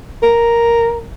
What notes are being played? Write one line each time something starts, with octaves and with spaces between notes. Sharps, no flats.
A#4